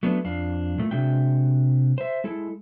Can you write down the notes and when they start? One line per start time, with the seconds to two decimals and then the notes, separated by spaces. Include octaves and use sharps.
0.03 F#3 A3 B3 D4
0.25 F2 D4 F5
0.78 A#2 A3
0.91 C3 G#3 D4 F#4 E5 G5
1.98 C5 E5
2.24 G#3 E4 A4